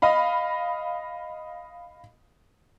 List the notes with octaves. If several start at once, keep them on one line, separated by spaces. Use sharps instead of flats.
D#5 F5 B5